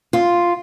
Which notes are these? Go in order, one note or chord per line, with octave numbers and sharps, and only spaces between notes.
F4